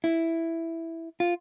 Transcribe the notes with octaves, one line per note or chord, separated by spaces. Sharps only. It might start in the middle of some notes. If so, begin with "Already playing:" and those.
E4
F4